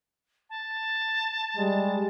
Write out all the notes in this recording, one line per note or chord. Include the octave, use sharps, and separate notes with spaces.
A5
G3 G#3